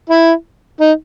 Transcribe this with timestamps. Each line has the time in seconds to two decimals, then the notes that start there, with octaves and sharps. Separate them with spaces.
0.10 E4
0.80 D#4